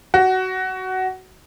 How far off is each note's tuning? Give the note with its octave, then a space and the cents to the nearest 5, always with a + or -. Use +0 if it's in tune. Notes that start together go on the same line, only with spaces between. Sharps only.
F#4 +15